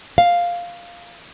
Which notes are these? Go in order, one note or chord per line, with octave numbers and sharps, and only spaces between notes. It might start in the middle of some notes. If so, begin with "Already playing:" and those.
F5